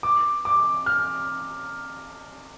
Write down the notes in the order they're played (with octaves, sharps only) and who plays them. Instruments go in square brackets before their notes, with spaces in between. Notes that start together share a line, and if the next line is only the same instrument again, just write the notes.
[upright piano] D6
D6
F6